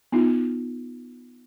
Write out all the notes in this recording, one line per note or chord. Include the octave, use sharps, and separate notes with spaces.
B3 D#4 F4